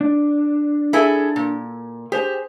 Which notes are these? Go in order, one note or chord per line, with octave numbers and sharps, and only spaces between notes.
D4
E4 G#4 A4
A#2
G4 G#4 C5 G#5